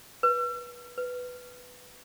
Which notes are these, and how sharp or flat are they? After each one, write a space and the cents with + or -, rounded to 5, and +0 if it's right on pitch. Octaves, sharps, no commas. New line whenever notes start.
B4 -20
B4 +5